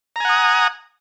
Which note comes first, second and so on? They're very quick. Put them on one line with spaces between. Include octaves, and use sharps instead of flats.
A#5 G#5 F#5 D#6